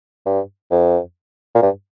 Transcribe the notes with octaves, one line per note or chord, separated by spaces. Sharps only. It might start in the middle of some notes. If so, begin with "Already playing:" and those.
G2
F2
A#2
G2